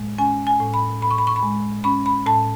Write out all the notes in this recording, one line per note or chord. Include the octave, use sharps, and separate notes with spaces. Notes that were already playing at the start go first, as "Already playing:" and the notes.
Already playing: A2 G#3
C#4 G#5
G#5
A2
B5
A2 B5
C#6
B5
C#6
B5
G#3
C#4 B5
B5
A2 A5